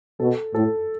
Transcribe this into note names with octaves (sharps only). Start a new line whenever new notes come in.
B2 A4
A2 A4